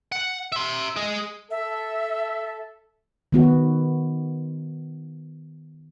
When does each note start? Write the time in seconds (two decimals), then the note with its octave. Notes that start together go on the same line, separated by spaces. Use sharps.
0.12 F#5
0.52 E5 C6
0.96 G#4 D#5
1.51 A4 E5
3.32 D#3 B3 F#4